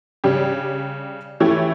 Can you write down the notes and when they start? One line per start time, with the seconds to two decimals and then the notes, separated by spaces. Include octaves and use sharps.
0.24 C#3 G3 D4 G4
1.40 E3 A3 C#4 E4 G4